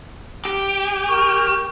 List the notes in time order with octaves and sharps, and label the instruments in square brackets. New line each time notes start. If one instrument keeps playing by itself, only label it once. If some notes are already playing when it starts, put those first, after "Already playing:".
[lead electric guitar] G4
[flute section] A#4 C#6 F6